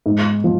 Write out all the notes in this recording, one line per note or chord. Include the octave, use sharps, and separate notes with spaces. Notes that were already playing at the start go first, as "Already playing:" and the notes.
G#2
F3